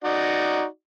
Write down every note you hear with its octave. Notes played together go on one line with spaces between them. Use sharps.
D#4 F#4 D5